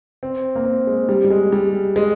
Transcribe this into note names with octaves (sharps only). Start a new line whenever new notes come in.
C4
A#3
C4
G#3
G3
G3
G#3
G3
G#3